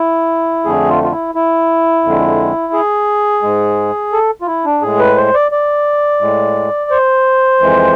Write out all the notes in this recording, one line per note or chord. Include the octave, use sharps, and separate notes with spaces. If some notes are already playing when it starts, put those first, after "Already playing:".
Already playing: E4
F2 D3 A3 G#4
F4
F4
E4
E4
F2 D3 G#3
G#4
G#2 G#3
A4
F4
E4
D4
A2 G#3 G#4
B4
C5
D5
D5
A2 G#3
C5
F2 E3 G#3